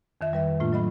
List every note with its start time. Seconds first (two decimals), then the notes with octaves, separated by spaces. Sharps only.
0.21 F2 D#3 E5
0.33 G3 B4 E5
0.60 A2 A3 A#3 D4 F4
0.73 F#3 D#5 B5